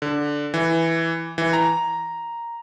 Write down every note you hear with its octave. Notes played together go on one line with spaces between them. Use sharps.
D3
E3
E3
A#5